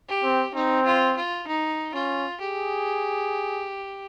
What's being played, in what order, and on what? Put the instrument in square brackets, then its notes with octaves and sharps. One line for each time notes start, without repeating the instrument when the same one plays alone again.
[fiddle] G4
[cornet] C4
[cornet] C4 [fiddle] D#4
[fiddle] F4
F4
D#4
[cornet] C#4 [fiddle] F4
[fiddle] G4 [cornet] G#4